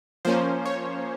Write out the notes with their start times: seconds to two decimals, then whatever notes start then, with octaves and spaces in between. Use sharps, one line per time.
0.25 F3 A#3 C#4 C5
0.65 C#5